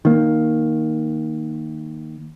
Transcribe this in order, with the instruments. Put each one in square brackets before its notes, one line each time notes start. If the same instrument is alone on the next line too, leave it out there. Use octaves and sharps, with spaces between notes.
[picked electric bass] D#3 A#3